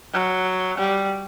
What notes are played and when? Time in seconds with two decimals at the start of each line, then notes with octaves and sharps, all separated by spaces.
0.13 F#3
0.78 G3